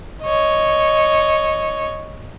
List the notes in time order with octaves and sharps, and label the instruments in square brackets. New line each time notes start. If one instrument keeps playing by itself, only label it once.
[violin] C#5 D#5